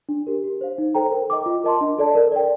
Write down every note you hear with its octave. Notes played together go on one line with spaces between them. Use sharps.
D4
G4 A#4
G4
C5 F5
D#4
A4 C5 G5 A#5
A#4
D#5 G5 D6
F4
A#4 D#5 A5 C6
D4
A4 D5 A5
A#4
D5 G5